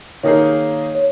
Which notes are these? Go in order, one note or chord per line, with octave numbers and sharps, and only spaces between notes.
D#3 A#3 D#4 G#4 C#5
C#5